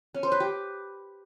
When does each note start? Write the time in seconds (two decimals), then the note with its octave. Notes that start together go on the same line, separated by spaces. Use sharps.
0.14 C#4
0.23 C5
0.32 B4
0.40 G4